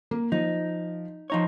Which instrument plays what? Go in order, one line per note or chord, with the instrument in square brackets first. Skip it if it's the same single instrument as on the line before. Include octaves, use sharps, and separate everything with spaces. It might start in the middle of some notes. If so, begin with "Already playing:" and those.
[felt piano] A#3
[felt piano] F3 [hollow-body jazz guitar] D#4
[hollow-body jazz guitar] F3 D#4 C#5